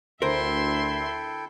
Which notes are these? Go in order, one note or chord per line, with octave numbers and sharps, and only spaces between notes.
D2 E4 A4 A#4 C5 E5 G5 C6